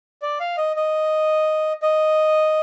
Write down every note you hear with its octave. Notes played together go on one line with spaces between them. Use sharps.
D5
F5
D#5
D#5
D#5